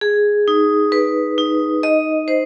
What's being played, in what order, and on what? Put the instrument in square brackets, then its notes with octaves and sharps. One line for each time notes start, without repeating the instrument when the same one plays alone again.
[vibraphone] G#4
D#4
B4
D#4
D#5
C5